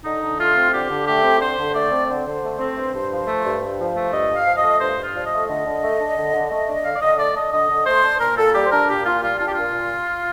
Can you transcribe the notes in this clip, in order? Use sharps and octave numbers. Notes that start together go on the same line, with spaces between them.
D3 D#4
D3
A3 F4
C4
D3 G4
D3
A3 G4
C4
D3 C5
D3
A3 D5
C4
D3 C5
D3
A3
C4
G2
G2
F3
A3
G2
G2
F3
A3
G2 D#5
G2 F5
F3
D#5
A3
G2 C5
G2
F4
F3 D5
D#5
A3
D3 D#5
D3
A3
D4
D3
D3
A3
D4
D3 F5
D5
D3 D#5
A3 D5
D4 D#5
D3 D#5
D3
A3 C5
D4
A#2 A#4
A#2 A4
G3 G4
C5
D4 A#4
A#2 G4
A#2 F4
G3 F4
D4 F4
G4
A#2 F4
A#2